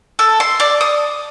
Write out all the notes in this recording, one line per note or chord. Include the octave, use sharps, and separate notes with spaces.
A4
C6
D5
D#6